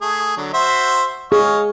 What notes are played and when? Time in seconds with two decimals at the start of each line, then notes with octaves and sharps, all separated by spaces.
0.01 A3 G#4
0.37 D3 F#3
0.54 F#4 C5 E5
1.32 G#4 C#5 D#5 F5